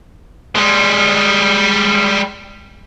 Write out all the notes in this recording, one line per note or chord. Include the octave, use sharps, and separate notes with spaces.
G3 G#3